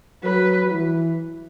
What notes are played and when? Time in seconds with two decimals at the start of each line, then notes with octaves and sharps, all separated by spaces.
0.23 F#3 B4
0.66 F#3
0.70 E3